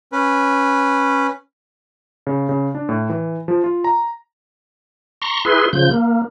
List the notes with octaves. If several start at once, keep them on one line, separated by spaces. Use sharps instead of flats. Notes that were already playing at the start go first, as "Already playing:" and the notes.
C#4 B4
C#3
C#3
D4
A2
E3
F3
F4
A#5
A#5 C6 C#6
E4 G#4 B4 C6
C#3 F3 G6
A#3